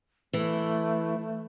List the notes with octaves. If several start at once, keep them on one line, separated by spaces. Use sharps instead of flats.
E3 A3 E4